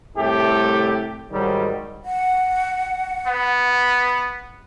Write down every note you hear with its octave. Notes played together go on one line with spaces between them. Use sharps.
C2 A2 A3 G4
G#2 D#3 F#3 G3
F#5
B3